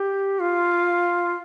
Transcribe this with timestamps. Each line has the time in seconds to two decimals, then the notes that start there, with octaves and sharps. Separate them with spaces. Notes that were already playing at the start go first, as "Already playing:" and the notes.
Already playing: G4
0.40 F4